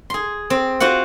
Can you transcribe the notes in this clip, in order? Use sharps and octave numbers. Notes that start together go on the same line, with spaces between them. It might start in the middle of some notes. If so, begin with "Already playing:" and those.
G#4 C6
C4
F4 F#4 C5 F#5